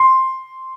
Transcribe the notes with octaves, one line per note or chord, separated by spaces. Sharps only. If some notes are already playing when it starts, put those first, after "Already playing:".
Already playing: C6